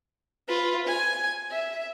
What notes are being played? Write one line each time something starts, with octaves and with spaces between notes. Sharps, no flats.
F4 B4
G#5
E5